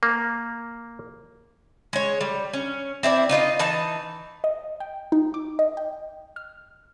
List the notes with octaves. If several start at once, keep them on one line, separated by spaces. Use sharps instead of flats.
A#3
G#3 C#5
G3
C#4
C4 E4 G#4 D5
D#4 F4 B4 D#5
E3 D#4 A5
D#5
G5
D#4
D6
D#5
G5
F6